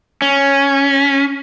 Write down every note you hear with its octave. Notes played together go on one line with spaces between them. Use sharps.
C#4